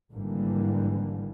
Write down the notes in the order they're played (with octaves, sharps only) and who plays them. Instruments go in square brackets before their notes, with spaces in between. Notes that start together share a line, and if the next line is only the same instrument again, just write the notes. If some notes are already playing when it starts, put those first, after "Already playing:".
[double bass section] G#1 G#2 D3 E3 G3 A#3